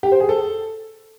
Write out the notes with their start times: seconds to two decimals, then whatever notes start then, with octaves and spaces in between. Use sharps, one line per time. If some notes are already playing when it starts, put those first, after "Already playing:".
0.03 G4
0.12 C5
0.20 G#4
0.29 A4